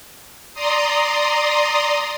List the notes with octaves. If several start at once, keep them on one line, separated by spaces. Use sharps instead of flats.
D5 A#5 C6 D#6